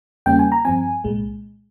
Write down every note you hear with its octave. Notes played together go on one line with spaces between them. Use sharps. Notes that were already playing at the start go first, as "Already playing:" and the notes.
E2 C#3 G3 A#3 C#4 G5
G#5
A#5
G2 F3 C4 G#5
C2 A#2 G#3